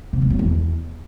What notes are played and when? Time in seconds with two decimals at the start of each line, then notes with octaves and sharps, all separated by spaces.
0.13 C3
0.22 G3
0.30 F#3
0.39 E2